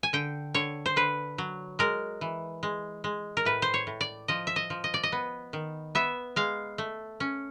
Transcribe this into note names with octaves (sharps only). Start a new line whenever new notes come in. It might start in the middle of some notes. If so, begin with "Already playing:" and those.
G#5
D3 G5
D3 C#5
C5
D3 B4
F#3
G#3 A#4
E3
G#3
G#3
A#4
A2 B4
C5
C#5
A2
D5
F3 D#5
E5
D#5
F3
D#5
D5
D#5
B3
D#3
B3 E5
G#3 F5
A3
C#4